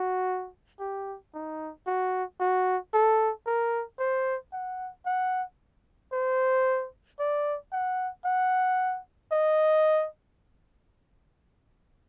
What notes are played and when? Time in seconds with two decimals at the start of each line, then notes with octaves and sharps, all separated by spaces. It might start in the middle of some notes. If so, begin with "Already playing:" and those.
Already playing: F#4
0.80 G4
1.34 D#4
1.86 F#4
2.40 F#4
2.94 A4
3.46 A#4
3.99 C5
4.53 F#5
5.06 F#5
6.12 C5
7.20 D5
7.72 F#5
8.25 F#5
9.32 D#5